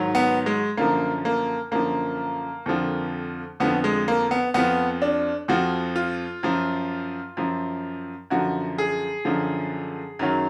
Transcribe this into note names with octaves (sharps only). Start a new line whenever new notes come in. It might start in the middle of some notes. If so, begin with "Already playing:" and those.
Already playing: G#2 D#3 F#3
B3
G#3
F#2 D3 F3 A#3
A#3
F#2 D3 F3 A#3
F2 D3 F3
F2 D3 F3 B3
G#3
A#3
B3
F2 F3 B3
D4
F2 F3 F#4
F4
F#2 F3
F#2 F3
F#2 D3 F3 F#4
G#4
F#2 D3 F3
F#2 D#3 F#3